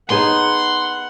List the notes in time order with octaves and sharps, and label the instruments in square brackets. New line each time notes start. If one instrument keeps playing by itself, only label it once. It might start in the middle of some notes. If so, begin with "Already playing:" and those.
[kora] B3 D#4 G#4 [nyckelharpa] F#5 [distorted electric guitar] C6